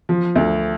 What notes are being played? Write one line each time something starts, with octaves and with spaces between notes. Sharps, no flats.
F3
D2